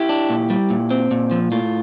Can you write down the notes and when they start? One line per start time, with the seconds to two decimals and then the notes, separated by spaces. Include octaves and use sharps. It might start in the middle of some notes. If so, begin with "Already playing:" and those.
Already playing: E4 G4
0.09 D4
0.30 A#2
0.50 G3
0.70 A#2
0.91 C4
1.11 A#2
1.31 F3
1.52 A2 F4